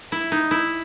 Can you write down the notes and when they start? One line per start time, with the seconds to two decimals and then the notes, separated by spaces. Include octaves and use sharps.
0.12 E4
0.32 D#4
0.51 E4